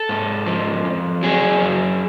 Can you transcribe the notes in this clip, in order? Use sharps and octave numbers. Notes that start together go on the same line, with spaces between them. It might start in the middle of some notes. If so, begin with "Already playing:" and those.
Already playing: A4
G#2
F3
F2
F#3 G#4
F#2